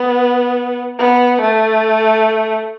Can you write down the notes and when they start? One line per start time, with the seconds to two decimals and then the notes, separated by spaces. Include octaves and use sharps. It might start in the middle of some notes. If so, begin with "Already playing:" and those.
Already playing: B3
0.98 B3
1.41 A3